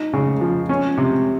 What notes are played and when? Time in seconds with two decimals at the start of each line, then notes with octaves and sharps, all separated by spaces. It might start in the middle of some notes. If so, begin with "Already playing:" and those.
Already playing: D#4
0.13 C#3
0.41 F3
0.69 C#4
0.97 C3